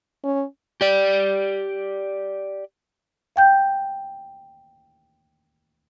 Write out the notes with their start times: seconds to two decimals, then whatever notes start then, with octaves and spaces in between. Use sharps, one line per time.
0.24 C#4
0.81 G4 D5
3.36 F5 G5 G6